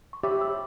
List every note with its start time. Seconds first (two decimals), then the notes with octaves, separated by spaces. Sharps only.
0.13 C#6
0.23 G4 C#5 E5 B5 D6
0.41 E6